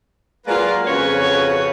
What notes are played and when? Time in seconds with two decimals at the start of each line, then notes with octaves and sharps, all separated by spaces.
0.47 F#3 G#3 A#3 F4 B4 D5
0.87 F2 C#3 F#4 B4 C#5